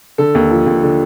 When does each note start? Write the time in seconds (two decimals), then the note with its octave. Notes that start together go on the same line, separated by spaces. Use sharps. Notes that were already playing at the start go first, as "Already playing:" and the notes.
0.18 D3 A4
0.35 D#2
0.51 F3
0.66 D#2
0.83 D3